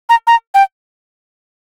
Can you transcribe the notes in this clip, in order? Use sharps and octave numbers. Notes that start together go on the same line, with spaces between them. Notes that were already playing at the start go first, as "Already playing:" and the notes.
A#5
A#5
G5